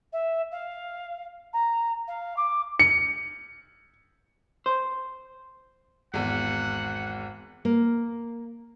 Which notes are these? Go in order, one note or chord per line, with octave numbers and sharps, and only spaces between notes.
E5
F5
A#5
F5
D6
C#7
C5
G#1 E2 F#5
A#3